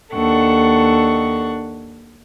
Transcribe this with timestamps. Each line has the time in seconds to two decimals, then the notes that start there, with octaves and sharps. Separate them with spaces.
0.14 D#2 D4 A4 F#5 C#6